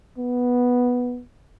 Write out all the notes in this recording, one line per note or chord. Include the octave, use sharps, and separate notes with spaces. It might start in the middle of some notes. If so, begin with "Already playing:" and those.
B3